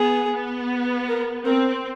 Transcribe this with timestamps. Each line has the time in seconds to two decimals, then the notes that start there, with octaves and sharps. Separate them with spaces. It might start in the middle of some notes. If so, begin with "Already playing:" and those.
Already playing: B3 G#4
0.32 B3
1.08 A#4
1.46 C4 A#4